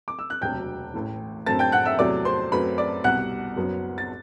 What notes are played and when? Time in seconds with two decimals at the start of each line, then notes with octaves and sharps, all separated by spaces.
0.08 D6
0.19 E6
0.30 F#6
0.41 E1 D2 C3 F#3 G5 G6
0.94 A1 A2 E3
1.46 F#2 D3 A3 C4 A5 A6
1.59 G5 G6
1.72 F#5 F#6
1.85 E5 E6
1.99 E2 C3 F#3 A3 D5 D6
2.25 C5 C6
2.52 F#2 F#3 A3 C4 B4 B5
2.78 D5 D6
3.04 C2 B2 G3 F#5 F#6
3.57 F#1 F#2 F#3 B3
3.98 A6